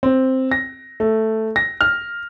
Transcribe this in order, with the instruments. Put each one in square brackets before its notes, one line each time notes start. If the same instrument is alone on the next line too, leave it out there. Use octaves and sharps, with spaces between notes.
[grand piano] C4
A#6
A3
A#6
F6